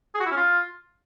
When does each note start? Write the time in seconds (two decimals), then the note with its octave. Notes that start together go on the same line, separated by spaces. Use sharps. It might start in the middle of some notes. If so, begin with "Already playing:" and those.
0.15 G#4
0.20 F#4
0.26 E4
0.31 C#4
0.37 F4